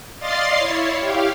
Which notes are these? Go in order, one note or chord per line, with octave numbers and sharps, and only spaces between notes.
D5 D#5 F5 C6 A6 C7
E4 C#5
G4 F5